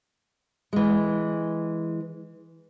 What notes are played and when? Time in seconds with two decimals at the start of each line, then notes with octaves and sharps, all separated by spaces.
0.73 E3 G#3